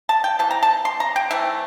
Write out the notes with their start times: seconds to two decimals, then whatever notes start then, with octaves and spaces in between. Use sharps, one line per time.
0.09 A5
0.24 G5
0.39 C3 E3 A5
0.51 A#5
0.63 A5
0.85 C6
1.00 A#5
1.16 G5
1.31 E3 A3 C4 E5